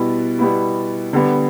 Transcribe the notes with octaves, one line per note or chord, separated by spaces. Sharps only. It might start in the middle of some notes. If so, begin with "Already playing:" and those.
Already playing: B2 G3 B3 E4
B2 G3 B3 E4
D3 G3 B3